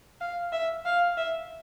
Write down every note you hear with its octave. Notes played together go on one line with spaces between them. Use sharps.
F5
E5
F5
E5